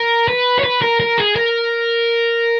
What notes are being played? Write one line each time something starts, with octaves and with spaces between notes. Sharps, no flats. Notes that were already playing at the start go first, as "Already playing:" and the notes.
Already playing: A#4
B4
C#5
B4
A#4
A#4
G#4
A#4